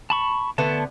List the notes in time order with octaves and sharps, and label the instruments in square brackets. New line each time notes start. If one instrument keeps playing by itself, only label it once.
[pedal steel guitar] A5 B5 C#6
[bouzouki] D3 A3 B3 [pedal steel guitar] A5